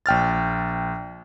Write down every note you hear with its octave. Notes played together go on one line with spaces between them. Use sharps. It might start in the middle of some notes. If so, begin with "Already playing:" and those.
A#1 G5 F6 A6